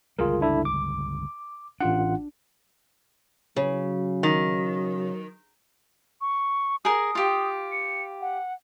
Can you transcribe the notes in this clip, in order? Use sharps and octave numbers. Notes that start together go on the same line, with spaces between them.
G1 C#2 G3 F4 G#4 A#4
D4 E4 A4
D6
A1 D4 F4 F#5
C#3 F#3
D#3
C#6
G#4 A#4 D#6
F4 G4
C#7
F#5